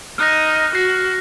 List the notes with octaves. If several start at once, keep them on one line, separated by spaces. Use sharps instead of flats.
D#4 F6 F#6 A#6
F#4 F#6 A#6 C7